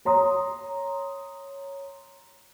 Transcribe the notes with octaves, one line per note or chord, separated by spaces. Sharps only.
C#5 A#5 C6 D#6